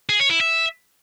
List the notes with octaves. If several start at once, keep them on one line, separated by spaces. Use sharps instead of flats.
G#4
C#5
E4
E5